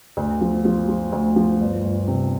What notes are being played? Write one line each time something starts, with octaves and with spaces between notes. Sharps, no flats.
D2
F3
F3
F3
D2
F3
G1
G1
C3